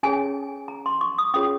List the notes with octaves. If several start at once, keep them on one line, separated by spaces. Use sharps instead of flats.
C#4 G#4 C#5 G#5
A#5
C6
C#6
D#6
C#4 F4 G#4 C#5 D#6